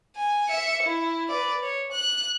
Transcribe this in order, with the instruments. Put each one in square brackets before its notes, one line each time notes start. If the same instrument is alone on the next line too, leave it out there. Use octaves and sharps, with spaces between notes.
[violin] G#5
E5 C#7
E4
B4 D5
C#5
F#6